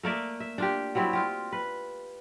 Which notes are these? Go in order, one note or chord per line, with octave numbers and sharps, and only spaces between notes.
A3 A#3 D5 E5
E5
D4 F4 G4
F#3 G3 C4 E4
F4 G4
B4